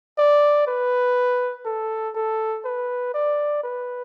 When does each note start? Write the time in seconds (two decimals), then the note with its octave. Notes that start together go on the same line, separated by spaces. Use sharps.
0.18 D5
0.67 B4
1.65 A4
2.15 A4
2.65 B4
3.14 D5
3.63 B4